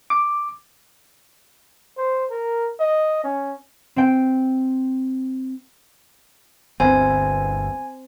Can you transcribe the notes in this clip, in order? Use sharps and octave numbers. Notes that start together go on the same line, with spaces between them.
D6
C5
A#4
D#5
C#4
C4 G5
G1 D2 B3 C4 G#5